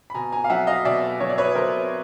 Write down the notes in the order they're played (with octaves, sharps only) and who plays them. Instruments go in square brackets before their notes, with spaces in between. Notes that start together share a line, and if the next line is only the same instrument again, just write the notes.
[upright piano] B5
B2 G#5 A#5
G#5 A#5
F5
F#3 E5 F#5
D#5 F5
B2 D5 E5
F#3 C#5
D5
B4 C#5
B2 A#4 C5